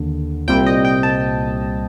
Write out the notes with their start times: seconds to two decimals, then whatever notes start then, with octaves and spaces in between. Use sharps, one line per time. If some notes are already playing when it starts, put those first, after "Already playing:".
Already playing: D#2 D3
0.48 C2 A#2 G3 C4 G5
0.66 D#5
0.85 G5
1.03 A5